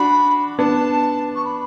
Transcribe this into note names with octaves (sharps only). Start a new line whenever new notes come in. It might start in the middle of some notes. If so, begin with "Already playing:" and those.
Already playing: D4 F#4 B5
B3 D4 A5
C#6
B5